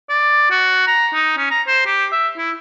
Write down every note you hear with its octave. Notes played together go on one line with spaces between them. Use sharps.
D5
F#4
A#5
D#4
C#4
A#5
C5
G4
E5
E4